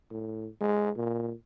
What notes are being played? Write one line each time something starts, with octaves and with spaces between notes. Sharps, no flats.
A2
G#3
A#2